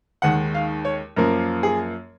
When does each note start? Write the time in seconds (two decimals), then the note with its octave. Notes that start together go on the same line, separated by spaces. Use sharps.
0.22 D#2 D#3 G#3 F#5
0.54 F5
0.85 C#5
1.16 F#2 F3 A#3 A#4
1.63 G#4